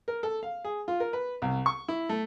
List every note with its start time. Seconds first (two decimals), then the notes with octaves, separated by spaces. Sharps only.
0.08 A#4
0.23 A4
0.43 F5
0.65 G#4
0.88 F4
1.00 A#4
1.13 B4
1.42 C2
1.66 C#6
1.88 E4
2.09 A3